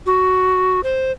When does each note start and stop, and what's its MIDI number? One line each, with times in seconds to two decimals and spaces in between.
0.06 0.81 66
0.84 1.12 72